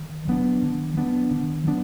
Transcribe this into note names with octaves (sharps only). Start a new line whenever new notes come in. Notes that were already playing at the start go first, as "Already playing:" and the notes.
Already playing: D#3
F#3 B3 D4
D#3
F#3 B3 D4
D#3
F#3 B3 D4